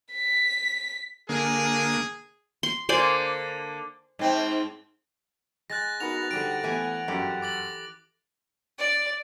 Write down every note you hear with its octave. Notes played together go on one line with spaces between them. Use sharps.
B6
D3 A#3 G#4
C6
D3 A#3 C5 D5 G#5
G#2 C4
G#3 F#6 A6 A#6
B3 D#4 F#4 A#4 B5 F7
D3 G3 C4 F#5 D7
E3 A3 B3 E5 G#5
G1 F#2 E4 F#4 G4 A4
D6 A6 F#7
D5